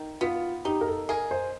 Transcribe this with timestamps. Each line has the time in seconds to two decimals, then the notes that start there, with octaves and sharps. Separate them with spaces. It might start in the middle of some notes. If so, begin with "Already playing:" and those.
Already playing: D#3
0.21 B3 F4
0.65 D#4 G4
0.81 A#4
0.87 A4
1.09 G#4 A#4
1.31 C5